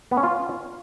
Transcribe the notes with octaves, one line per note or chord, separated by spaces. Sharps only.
B3
C#4
F4